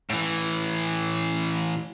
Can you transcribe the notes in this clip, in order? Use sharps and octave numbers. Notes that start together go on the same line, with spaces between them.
A2 E3